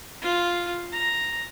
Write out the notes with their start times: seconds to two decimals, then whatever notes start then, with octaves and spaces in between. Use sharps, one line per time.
0.22 F4
0.92 A#5